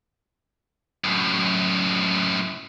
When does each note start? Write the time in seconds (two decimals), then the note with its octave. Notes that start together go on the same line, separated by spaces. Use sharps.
1.04 F#2 A2